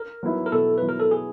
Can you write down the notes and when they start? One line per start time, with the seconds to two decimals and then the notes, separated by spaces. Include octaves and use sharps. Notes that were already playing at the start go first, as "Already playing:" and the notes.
Already playing: A#4
0.23 F#3 B3 E4
0.46 A#4
0.52 B2 A4
0.78 F#3 B3 E4 B4
0.89 A#4
1.00 A4
1.11 G#4